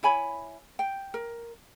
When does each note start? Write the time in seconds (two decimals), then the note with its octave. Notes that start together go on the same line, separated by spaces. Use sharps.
0.03 E4 C#5 G#5 B5
0.79 G5
1.14 A#4